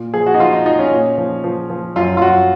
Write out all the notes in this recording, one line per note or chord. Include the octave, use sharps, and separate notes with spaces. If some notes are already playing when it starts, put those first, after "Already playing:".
Already playing: A#2
F3 G#4
F#4
D#4
F3 F4
D#4
F3 D#4
C#4
A#2
F3
F3
F3
F#2 F4
F4
F#2 F#4